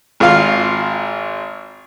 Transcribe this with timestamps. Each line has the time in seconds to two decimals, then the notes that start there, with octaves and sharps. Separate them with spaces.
0.20 G#1 F4 F5